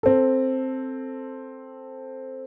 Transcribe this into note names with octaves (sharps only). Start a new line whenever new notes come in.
C4 A4